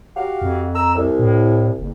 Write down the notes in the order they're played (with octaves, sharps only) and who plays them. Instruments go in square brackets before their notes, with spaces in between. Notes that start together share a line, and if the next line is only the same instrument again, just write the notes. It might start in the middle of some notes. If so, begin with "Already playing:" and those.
[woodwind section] F#4 G4 F5
[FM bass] F2
[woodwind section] A#5 E6
C2
[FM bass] A2
F#1